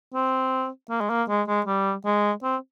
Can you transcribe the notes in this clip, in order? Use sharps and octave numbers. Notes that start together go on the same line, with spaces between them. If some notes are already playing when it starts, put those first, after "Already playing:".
C4
A#3
G#3
A#3
G#3
G#3
G3
G#3
C4